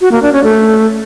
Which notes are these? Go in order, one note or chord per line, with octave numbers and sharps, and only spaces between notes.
F#4
A#3
D4
C#4
A3